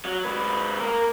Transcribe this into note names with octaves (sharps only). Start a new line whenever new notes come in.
F#3
G#2 B4
A#3 A#4